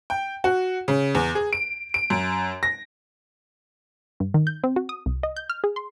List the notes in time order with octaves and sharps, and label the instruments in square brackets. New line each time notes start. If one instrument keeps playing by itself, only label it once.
[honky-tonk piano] G5
F#4
C#3
E2
G#4
D7
D7
F#2
A#6
[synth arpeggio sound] G2
D#3
G6
C4
F#4
D#6
C2
D#5
G6
F6
G#4
C6